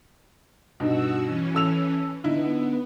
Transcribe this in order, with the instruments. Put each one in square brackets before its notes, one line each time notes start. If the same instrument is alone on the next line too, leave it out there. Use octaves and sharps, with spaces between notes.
[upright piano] G2 B2 D#4 [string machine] F#4 E6
[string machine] E3 C#4
[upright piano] A4 E6 F7
[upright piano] D3 D#4 E4 [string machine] B3